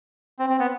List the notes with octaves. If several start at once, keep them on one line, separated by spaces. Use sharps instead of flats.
C4
C4
B3